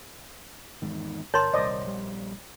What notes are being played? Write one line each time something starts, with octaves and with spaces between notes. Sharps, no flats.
E2 G#2 D#3
G1 A#4 C#5 A5 C6
D#1 C2 C5 D5 D#5
A#1 G3